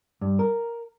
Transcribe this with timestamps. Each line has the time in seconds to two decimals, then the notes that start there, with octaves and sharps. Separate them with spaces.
0.21 G2
0.39 A#4